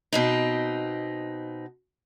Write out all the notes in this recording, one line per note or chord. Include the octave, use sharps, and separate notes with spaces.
B2 C4 D#4